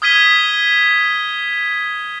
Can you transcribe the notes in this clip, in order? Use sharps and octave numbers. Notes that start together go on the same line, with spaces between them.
D#6 F6 G#6 B6 D#7 G7